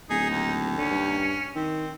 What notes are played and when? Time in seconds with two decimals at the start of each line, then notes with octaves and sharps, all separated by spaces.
0.10 D1 D#4 G#4
0.29 D#2
0.77 D3 C#4
0.91 G2
1.55 D#3 C4